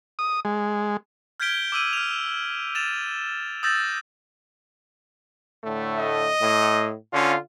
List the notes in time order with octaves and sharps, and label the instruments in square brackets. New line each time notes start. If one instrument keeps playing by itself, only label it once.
[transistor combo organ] D#6
G#3
[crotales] F6 G6 G#6 B6 D7 G7
D6 E6 D#7
F6 F7
A6 E7 F7
D#6 E6 G6 A6 A#6
[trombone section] A2 D3 A3
[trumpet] D#5
[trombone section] A2
[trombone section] D3 F4 [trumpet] C#4